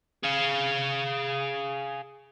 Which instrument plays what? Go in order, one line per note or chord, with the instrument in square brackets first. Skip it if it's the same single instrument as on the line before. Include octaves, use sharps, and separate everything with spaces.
[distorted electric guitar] G#4 F5